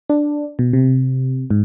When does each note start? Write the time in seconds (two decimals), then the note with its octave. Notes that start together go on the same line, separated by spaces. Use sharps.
0.10 D4
0.59 B2
0.73 C3
1.51 G#2